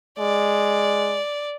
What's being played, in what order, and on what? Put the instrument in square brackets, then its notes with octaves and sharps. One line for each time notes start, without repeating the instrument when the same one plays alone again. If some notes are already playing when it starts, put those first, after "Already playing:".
[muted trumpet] G#3 [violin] D5